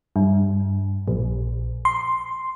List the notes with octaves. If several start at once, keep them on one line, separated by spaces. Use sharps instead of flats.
G2
A#1
C6